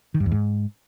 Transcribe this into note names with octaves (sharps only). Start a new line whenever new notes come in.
D#3
G2
E2
G#2